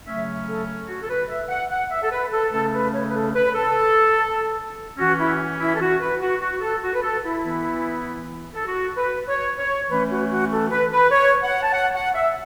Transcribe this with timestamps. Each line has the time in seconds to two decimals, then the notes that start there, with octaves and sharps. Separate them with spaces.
0.06 C#3 F#3 A3 C#4 E5
0.47 A4
0.88 F#4
1.02 A4
1.09 B4
1.29 E5
1.49 F#5
1.70 F#5
1.90 E5
2.02 A4
2.10 B4
2.32 A4
2.52 C#3 A3 C#4 A4
2.72 B4
2.93 C#5
3.09 B4
3.14 A4
3.34 B4
3.54 A4
4.98 E3 C#4 F#4
5.18 E4
5.59 E4
5.73 A4
5.80 F#4
6.00 B4
6.20 F#4
6.41 F#4
6.61 A4
6.82 F#4
6.94 B4
7.02 A4
7.23 E4
7.43 E3 B3
8.54 A4
8.66 F#4
8.96 B4
9.28 C#5
9.58 C#5
9.88 E3 A3 C#4 B4
10.09 F#4
10.30 F#4
10.51 A4
10.70 B4
10.92 B4
11.11 C#5
11.43 F#5
11.63 A5
11.73 F#5
11.94 F#5
12.14 E5